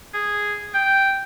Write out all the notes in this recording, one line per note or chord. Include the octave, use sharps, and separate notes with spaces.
G#4
G5